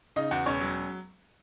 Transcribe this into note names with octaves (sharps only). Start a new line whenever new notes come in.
C#3 D#4 D#5
E2 F#4 F#5
E1 C#4 C#5
F#3